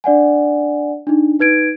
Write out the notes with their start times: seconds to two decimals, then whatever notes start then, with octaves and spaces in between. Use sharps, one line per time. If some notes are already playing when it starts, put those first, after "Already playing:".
0.04 D4 D5 F#5 G#5
1.07 D4 D#4
1.39 D#4 B4 G#6 D7